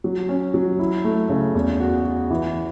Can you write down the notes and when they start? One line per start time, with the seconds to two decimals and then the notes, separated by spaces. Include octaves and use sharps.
0.04 F#3
0.29 C#4
0.54 F#3
0.79 E4
1.05 A3
1.29 C#3
1.55 E2
1.80 F#4
2.05 F#4
2.31 E3